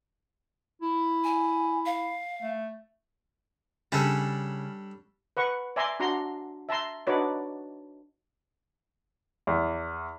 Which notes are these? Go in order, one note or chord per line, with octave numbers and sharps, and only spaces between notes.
E4
G#5
F5
A3
C#3 G3 D4 A4
B4 F#5 C#6
D5 E5 G#5 A#5 C6
D4 F#4 A#5 C6
E5 A5 A#5 C6
D4 D#4 F#4 B4 C#5 D5
E2